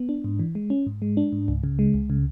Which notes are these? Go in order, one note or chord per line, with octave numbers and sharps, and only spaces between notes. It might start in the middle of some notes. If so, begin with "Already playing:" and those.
Already playing: B3
D4
G#2
E3
G#3
C#4
G#2
G#3
D4
G#2
C#2
C#3
G#3
C#2
C#3